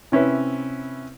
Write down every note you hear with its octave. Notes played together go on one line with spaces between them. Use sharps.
C3 C#4 E4 B4